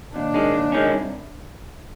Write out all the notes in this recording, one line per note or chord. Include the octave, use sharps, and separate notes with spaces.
D#2 D4
D#3 G#3 C#4
D#2
D#3 G#3 C#4
C2